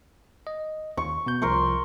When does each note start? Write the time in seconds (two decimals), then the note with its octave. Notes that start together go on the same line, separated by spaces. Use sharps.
0.47 D#5
0.97 D#2 C#6
1.26 B2 B3 G6
1.42 C2 F3 A#4 C6 C#6